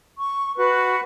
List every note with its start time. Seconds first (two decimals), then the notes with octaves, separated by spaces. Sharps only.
0.18 C#6
0.58 F#4 B4